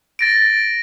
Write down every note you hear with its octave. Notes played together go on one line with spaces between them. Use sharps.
A6 A#6 D7